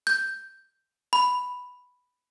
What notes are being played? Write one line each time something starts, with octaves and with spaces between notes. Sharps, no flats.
G6
B5